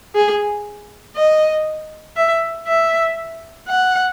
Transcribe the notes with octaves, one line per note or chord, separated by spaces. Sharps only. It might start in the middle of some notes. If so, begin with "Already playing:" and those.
G#4
D#5
E5
E5
F#5